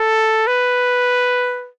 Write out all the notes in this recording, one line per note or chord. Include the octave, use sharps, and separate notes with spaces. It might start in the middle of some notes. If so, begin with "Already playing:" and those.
Already playing: A4
B4